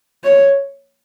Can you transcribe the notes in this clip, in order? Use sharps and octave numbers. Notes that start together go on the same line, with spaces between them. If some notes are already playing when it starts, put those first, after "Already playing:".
C#5